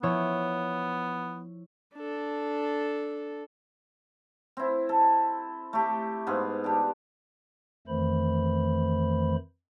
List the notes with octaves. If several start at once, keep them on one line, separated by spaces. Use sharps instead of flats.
F3 B3 E4 C#5
D4 A4
C4 E4
A4
A3 G4
G#2 B3 F4 G#4
D4 G4
F2 D#3 E3 A3 C5 B5